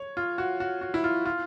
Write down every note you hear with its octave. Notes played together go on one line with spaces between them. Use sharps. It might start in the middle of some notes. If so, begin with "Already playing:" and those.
Already playing: C#5
F4
F#4
F#4
F#4
E4
F4
F4